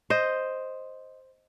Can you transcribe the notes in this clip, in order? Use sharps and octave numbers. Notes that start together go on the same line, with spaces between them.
C5 D#5